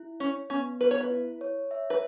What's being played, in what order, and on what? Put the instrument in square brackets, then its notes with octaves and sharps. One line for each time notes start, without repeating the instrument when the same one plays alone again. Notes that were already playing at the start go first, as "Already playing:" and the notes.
Already playing: [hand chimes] E4
[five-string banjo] C#4 [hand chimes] C#5
[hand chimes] B3 [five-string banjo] C#4
[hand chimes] B3 [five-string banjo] B4
[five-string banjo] C#5
B4
[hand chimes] E4
C#5
E5
[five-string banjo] B4